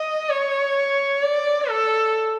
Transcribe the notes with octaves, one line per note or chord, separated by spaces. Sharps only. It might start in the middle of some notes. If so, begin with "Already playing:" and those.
Already playing: D#5
C#5
D5
A4